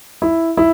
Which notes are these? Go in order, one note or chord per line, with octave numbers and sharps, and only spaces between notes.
E4
E4